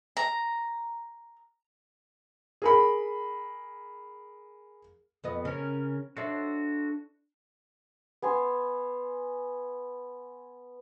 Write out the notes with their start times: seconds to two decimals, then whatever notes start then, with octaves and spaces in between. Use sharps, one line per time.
0.17 A#5
2.62 G#4 A#4 B5
5.24 F2 B3 D#5
5.45 C#3 C#4 A#4
6.17 D4 F#4 A4 C#5 E5 C6
8.22 B3 G#5 C6